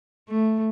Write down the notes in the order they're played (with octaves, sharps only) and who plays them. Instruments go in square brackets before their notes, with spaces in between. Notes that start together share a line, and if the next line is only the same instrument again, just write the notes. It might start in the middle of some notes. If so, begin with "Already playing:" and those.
[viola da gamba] A3